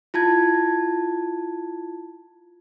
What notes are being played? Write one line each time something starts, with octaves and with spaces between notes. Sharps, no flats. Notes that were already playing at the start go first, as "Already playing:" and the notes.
E4 F4 A5 G#6